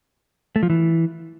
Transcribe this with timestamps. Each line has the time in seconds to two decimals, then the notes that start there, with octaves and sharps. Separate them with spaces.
0.56 A3
0.63 F3
0.70 E3